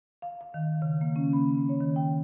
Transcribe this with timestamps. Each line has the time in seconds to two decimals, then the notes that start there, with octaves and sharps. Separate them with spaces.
0.22 F5
0.41 F5
0.54 D#3
0.82 C#3
1.01 A#3
1.16 C#4
1.33 B5
1.69 C#5
1.81 D#3
1.96 G5